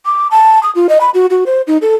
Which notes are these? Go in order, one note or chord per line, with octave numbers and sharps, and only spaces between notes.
D6
A5
D#6
F4
D#5
B5
F#4
F#4
C5
D#4
A4